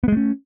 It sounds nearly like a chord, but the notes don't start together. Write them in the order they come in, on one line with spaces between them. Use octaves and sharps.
B3 G#3 A3 C#4